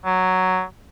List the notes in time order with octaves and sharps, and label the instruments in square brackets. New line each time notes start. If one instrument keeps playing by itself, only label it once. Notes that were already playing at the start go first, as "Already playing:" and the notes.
[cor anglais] F#3